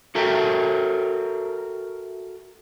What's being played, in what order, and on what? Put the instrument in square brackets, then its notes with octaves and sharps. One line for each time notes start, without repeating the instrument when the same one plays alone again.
[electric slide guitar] F#4 A4 A#4 E5 G5